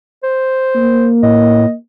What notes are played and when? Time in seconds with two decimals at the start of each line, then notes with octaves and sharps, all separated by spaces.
0.23 C5
0.76 A#3
1.23 A2 D#5